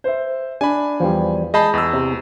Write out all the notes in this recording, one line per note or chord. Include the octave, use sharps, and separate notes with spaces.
C5 E5
D4 G#5 B5
E2 F3 G3 C5
G#3 D#5 A5 B5 G6 C7
E2 E6
C3